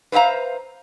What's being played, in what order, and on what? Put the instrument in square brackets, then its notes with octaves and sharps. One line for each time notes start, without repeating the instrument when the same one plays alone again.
[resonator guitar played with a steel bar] B4 C5 E5 F5 A#5